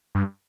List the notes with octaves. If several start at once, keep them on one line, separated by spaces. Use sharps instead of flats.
G2